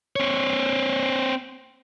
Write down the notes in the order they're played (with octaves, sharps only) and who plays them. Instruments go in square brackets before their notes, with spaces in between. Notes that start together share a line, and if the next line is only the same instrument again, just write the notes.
[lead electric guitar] C4 C#5